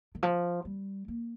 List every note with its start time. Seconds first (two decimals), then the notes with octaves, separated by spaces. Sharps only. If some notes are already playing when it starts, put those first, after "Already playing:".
0.15 D#3
0.23 F3
0.65 G3
1.08 A#3